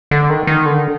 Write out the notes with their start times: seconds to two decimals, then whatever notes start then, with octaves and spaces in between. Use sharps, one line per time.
0.11 D3
0.30 D#3
0.47 D#3
0.66 D3